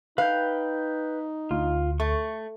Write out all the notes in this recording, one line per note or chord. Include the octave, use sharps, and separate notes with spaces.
D#4 B4 F5 G5
D2 F4
A3 C#6